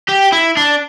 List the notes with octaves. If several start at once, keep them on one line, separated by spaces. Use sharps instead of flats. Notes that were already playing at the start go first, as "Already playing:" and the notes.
G4
E4
D4